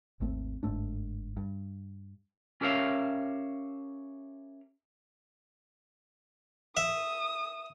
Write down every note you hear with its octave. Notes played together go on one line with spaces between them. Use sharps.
G#1 D#2 A3 C4
G1 G#2 A3 D4
G2
C#4 G4 A#4 C#5 E5 F5
E5 D#6